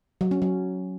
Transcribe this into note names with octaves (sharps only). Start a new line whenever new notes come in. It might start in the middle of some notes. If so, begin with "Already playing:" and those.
F#3
C#4
F#3